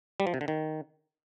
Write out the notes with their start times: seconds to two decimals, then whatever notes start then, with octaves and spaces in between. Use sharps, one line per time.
0.20 G3
0.27 F3
0.34 C3
0.41 D3
0.48 D#3